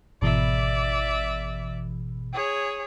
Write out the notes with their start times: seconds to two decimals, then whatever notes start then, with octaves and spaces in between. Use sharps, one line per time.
0.22 G#1 B2 E3 D5 E5
2.33 G#4 C#5